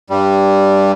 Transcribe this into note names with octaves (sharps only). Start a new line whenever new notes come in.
G2 G3